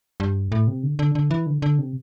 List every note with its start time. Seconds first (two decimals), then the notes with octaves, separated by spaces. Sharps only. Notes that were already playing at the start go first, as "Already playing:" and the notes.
0.20 G2
0.52 A2
0.67 C3
0.83 D3
0.99 D3
1.15 D3
1.31 E3
1.47 D3
1.62 D3
1.79 C3